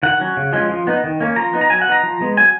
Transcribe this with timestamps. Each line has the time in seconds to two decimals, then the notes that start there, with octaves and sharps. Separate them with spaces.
0.03 D#3 F#5
0.20 F#3 C#4
0.37 C#3
0.53 F3 G#3 C#4
0.69 F3
0.87 B3 D#4
1.04 D#3
1.21 A#3 C#4
1.36 F3 A#5
1.53 B3 D#4
1.61 A#5
1.70 F#3 G#5
1.82 F#5
1.87 B3 D#4 A#5
2.03 F3
2.21 G#3 B3
2.37 F#3 G#5